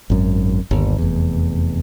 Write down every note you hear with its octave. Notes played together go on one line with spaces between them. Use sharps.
G#1 F#2
G1 D#2
F1 E2